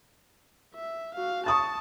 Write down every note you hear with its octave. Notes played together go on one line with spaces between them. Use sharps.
E5
F#4 F5
A5 C#6 D#6 A6